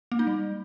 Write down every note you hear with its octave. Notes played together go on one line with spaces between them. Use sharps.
A#3
D#4
G3